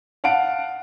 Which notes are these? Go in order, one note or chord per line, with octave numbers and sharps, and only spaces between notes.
F5 F#5 A5 D7